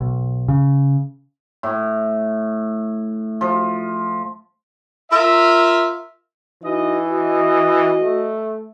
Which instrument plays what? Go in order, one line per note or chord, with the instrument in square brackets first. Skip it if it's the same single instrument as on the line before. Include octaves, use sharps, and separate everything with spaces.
[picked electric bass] B1
C#3
[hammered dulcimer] A2
F3
[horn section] F4 A#4 E5
[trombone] E3 [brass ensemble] D#4 F#4 D#5
[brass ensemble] F#4 D#5
[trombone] A3